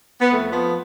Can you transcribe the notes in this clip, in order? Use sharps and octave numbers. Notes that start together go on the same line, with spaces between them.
B3
F2 A3
F3 B3